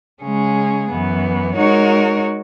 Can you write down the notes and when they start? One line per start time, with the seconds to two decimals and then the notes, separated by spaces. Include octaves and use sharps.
0.22 C#3 G#3 C#4 G#4
0.89 F#2 E3 B3
1.55 G#3 D#4 F#4 A#4 C#5